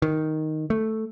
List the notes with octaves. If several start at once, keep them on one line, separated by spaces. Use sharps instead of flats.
D#3
A3